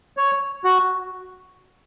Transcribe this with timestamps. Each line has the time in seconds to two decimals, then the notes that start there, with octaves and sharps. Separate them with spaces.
0.17 C#5
0.64 F#4